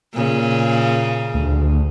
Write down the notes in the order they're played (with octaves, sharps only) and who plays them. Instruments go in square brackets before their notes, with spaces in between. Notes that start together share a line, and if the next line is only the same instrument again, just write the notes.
[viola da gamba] A#2 C#3
[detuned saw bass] D2